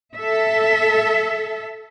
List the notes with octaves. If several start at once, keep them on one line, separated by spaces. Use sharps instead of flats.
A4 E5